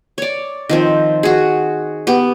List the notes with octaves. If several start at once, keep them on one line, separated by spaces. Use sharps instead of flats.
C#5 D5
D#3 F3 C4
F#4 G#4
B3 G4